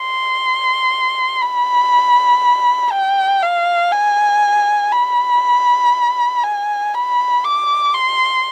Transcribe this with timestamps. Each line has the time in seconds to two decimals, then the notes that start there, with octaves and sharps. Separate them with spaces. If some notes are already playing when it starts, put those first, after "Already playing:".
Already playing: C6
1.42 B5
2.92 G5
3.42 F5
3.92 G#5
4.93 B5
6.44 G#5
6.94 B5
7.44 D6
7.94 C6